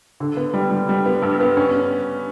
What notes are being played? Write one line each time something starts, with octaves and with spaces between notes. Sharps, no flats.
D3
B3
G3
G3
G3
B3
G2
B3
C#4